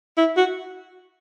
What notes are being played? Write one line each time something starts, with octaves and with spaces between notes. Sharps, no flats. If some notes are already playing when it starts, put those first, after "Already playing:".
E4
F#4